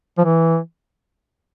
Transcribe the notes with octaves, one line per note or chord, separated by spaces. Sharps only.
F3
E3